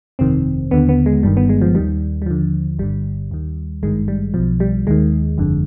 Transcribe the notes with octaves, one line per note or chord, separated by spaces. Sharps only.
G1 F2 C3 D#3 C4
D#2 D3 B3
B3
G#3
G1 G2 D#3 G3
B3
G#3
F3
D#2 D#3 G3
G3
D#2 D3 F3
G1 G2 D3 G3
D#2 D#3
G#1 G2 D#3 G#3
G3
B1 B2 F3
G3
D#2 D#3 G#3
G1 F2 D3